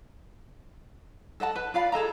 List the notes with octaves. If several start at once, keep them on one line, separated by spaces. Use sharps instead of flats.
A4 D#5 F#5 A5
B4
F4 D5 F5 B5
G#4 A4 D#5 A#5